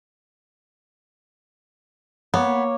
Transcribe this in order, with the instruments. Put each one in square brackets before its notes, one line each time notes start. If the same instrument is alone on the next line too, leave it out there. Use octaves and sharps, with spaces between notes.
[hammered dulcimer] A#3 [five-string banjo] B3 [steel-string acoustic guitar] C#5